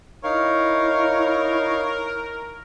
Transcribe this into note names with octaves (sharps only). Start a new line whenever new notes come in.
D#4 E4 A#4 C#5 F5